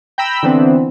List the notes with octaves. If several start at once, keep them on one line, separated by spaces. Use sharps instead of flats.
G5 A#5 B5 E6
D3 E3 B3 C4